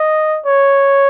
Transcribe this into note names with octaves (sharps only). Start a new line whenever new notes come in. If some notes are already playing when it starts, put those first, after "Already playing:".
Already playing: D#5
C#5